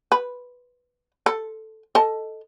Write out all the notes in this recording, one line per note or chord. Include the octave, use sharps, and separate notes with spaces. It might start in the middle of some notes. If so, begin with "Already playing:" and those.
B4
A4
A4 D#5 A5